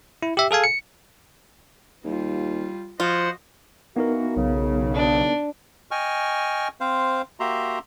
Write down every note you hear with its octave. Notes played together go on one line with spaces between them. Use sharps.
E4
G4 E5
G#4 A4 F5 G#5
C#7
D#2 G3 F4
F3 F4 F#4 C5 D#5 F#5
E3 A#3 B3 D#4 F#4 A#4
B1 C#3
D4
D#5 G5 G#5 C#6 F6
C4 C5 F5
A#3 F#4 G4 E5 A#5 C6